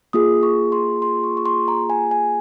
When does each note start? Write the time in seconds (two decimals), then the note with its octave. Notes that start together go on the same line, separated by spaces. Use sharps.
0.13 A#3 F4 G#4 D#6
0.43 C#6
0.72 C6
1.02 C6
1.24 C#6
1.37 C#6
1.46 C6
1.68 A#5
1.90 G#5
2.11 G#5